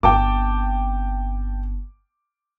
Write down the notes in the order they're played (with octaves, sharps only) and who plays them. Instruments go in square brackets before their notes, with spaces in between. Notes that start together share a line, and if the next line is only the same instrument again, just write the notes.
[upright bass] G1 C4 [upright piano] G5 A5 D6